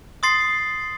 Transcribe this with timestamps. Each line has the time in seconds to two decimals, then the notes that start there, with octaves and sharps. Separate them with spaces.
0.23 C6 D#6 A6 C7